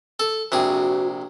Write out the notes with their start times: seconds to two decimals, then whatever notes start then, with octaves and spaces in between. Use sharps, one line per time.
0.20 A4
0.52 A#1 C3 F#4 G#4